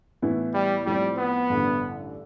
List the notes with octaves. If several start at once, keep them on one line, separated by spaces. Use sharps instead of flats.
A2 E3 B3 E4
G3
A2 F3 G3 C4
B3
A1 G2 D3